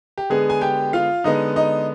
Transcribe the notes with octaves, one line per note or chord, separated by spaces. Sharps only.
G4
D3 G#3 B3 G#4
G#5
G4 G5
F4 F5
D3 G#3 B3 D#4 D#5
D#4 D#5